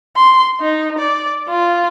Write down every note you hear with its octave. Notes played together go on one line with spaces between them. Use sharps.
C6
D#4
D5
F4